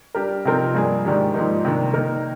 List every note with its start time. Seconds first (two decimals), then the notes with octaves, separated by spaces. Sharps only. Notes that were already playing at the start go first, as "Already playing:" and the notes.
0.15 G3 D4 G4 A#4
0.45 C3 F3 C4 D#4 A#4
0.74 G2 F3 A#3 D4 G#4
1.05 G#2 D#3 G3 D4 G4
1.34 G#2 F3 A#3 D#4
1.65 C3 D#3 G3 A#3 D4
1.94 D#3 A#3 D#4 A#4